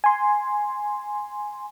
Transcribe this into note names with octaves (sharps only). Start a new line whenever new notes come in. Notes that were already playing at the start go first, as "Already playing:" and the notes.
G#5 C6